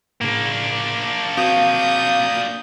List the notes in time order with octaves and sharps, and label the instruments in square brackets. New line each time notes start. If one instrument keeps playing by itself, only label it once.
[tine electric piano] A2 C#3 [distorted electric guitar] A#3 D4
[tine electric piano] C4 F#4 [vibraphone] F5 [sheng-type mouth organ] D#6 G6